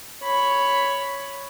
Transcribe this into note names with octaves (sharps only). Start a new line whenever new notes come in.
C#5 B5